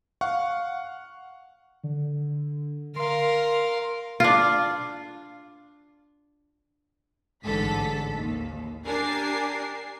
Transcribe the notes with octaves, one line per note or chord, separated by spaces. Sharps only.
F5 F#5 C#6
D3
A#4 F5 C6
D4 F4
A1 G#2 D3 A4 B6
D#2
D4 G4 A#4 G#5 C7